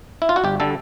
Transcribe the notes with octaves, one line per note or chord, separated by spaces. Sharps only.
E4
F4
F#4
G1 G4
D3 G3 A4